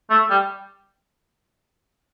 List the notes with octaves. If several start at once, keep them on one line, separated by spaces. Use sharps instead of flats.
A3
G3